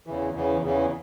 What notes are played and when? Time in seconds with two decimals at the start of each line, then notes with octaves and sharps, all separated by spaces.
0.07 E2 C#3 E3
0.35 E2 C#3 E3
0.63 E2 C#3 E3